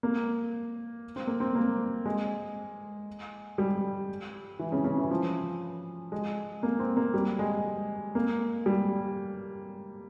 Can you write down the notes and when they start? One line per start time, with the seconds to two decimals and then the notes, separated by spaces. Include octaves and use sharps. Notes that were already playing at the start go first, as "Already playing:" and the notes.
0.03 A#3
1.16 C4
1.27 A#3
1.40 C4
1.55 A#3
2.06 G#3
3.58 G3
4.59 E3
4.72 C#3
4.85 C#3
4.97 E3
5.11 F3
6.12 G#3
6.63 A#3
6.79 C4
6.97 A#3
7.14 G3
7.39 G#3
8.15 A#3
8.66 G3